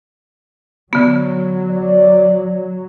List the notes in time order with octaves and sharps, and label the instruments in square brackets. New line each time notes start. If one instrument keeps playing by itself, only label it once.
[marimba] D3 B3 [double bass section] F#3
[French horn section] D5